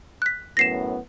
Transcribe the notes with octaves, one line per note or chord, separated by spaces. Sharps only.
F#6 B6
F#2 A2 B3 A#6 C7 E7